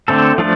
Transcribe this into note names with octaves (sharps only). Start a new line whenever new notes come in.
D3 A3 C4 A4
F3 A3 D4